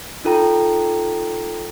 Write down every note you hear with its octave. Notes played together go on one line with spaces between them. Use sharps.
D#4 F4 A4 G5 A#5